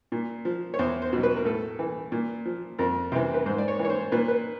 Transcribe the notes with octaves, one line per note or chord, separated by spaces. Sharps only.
A#2
F3
C#5
E2 C5
C5
B2 F#3
B4
A#4
A2 A4
E3
A#2
F3
F2 A#4
C3 E3 C5
B4
G#2 C5
D5
C#5
E3
C#5
C5
A#2 B4
B4